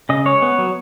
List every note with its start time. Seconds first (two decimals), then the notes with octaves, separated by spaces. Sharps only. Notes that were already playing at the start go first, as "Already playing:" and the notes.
0.09 C#3 D#5
0.25 G#3 C#5
0.42 B3
0.58 F#3